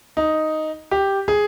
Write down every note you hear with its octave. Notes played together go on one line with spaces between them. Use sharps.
D#4
G4
G#4